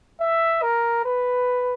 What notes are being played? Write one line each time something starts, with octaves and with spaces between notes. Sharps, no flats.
E5
A#4
B4